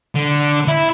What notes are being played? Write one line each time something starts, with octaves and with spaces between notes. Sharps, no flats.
D3
E4